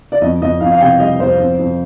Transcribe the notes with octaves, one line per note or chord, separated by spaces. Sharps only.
D5
F2 D#5
F2 D#5
F2 F5
F5
C3 G5
G3 D#5
F2 C5
F2
F2